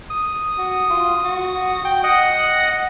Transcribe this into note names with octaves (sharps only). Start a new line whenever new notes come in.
D#6
F#4
F4
F#4
G5
D#5 F#5 D#6 F#6